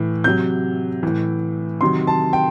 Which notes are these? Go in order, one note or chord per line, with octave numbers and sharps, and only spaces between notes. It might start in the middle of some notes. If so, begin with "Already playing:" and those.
Already playing: A2 E3
C3 F#3 G6
A2 E3
C3 D#3 F#3 C6
A5
G5